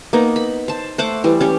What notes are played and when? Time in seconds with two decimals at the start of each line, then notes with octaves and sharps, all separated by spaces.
0.13 A#3 B3 D#4
0.36 B5
0.68 C5 A5
0.98 A3 C5 F#5 D6
1.24 E3 G3
1.41 C#4 G4